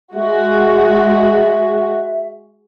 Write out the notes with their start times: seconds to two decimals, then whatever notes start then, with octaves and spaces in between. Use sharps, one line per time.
0.14 G#3 F#4 E5